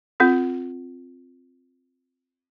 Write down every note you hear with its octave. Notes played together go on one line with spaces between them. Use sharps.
C4 F4 A4